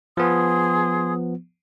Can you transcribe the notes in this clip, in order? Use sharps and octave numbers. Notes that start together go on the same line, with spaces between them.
F3 B3 G#4 C6 D#6